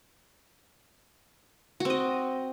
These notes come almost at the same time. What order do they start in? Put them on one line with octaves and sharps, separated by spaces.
F#4 C4 D#5